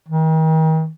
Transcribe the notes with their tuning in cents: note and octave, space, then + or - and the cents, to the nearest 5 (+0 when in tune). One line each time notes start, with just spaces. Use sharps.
D#3 +40